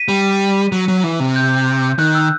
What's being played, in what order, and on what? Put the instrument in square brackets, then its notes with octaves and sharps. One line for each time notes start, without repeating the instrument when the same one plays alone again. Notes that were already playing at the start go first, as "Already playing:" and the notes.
Already playing: [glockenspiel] B6 D#7
[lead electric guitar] G3
F#3
F#3
E3
C3
[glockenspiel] G6
[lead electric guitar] D#3 [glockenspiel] F#6
[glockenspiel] E6